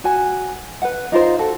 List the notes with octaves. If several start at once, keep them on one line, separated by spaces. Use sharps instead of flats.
F#4 G#5
B4 F#5
D#4 F4 A#4 C5
F#4 A4